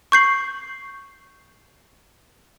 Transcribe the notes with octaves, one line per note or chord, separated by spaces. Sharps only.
C#6 G6 C7 F#7